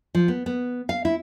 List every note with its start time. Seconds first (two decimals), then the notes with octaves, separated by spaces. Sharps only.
0.15 F3
0.28 B3
0.46 B3
0.89 F5
1.05 E4